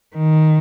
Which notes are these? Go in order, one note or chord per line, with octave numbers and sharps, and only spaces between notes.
D#3